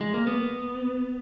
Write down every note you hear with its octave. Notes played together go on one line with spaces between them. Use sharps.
G#3
A#3
B3